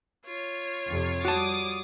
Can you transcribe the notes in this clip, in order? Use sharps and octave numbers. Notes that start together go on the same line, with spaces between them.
F4 C#5
F2 C3
G3 F#4 A5 D6 D#6